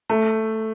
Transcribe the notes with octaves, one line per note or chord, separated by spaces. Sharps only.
A3